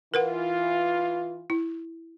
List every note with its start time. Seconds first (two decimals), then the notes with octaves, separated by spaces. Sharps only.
0.14 E3 F4 A#4 B4 F#5
1.50 E4